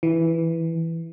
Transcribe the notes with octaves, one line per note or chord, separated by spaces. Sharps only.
E3